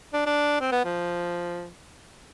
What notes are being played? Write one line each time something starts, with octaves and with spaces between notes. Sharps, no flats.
D4
D4
C4
B3
F3